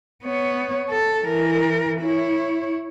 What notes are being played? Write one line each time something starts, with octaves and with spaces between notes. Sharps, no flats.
B3 C#5
A4
E3 A#4
E4 C#5